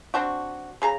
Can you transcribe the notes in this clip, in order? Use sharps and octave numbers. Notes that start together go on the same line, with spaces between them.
C4 D4 F#4
C#3 G#4 A#5